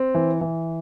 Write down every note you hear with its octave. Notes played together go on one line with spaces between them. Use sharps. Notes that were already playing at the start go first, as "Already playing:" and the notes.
Already playing: C4
E3
E3